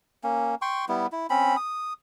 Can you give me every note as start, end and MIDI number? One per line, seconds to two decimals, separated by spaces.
0.23 0.55 58
0.23 0.55 61
0.62 0.85 79
0.62 0.85 84
0.62 0.85 85
0.88 1.07 55
0.88 1.07 59
0.88 1.07 64
1.12 1.27 64
1.30 1.56 60
1.30 1.56 61
1.30 1.56 83
1.57 1.93 87